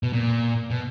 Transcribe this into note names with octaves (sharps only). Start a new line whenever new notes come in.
B2
A#2
B2